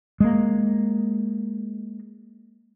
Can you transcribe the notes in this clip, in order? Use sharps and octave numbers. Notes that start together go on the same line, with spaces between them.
G#3 A#3